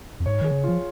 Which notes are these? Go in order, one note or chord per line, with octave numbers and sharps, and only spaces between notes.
F2
G#2 C#5
D#3 G#4
C#3
F3 F4